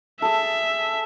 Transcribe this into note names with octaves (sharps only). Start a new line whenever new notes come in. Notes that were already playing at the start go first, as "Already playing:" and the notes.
G#4 A4 E5